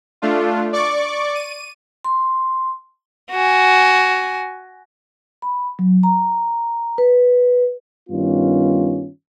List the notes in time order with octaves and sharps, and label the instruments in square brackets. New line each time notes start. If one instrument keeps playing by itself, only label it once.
[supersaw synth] A3 D4 F4
D5 C#6 D6
D#7
[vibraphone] C6
[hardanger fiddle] F#4 G#5
[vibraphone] B5
F#3
A#5
B4
[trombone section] G2 D#3 G3 B3 C#4 F4